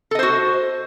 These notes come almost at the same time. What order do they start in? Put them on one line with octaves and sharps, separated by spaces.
A4 D#5 C5 F#4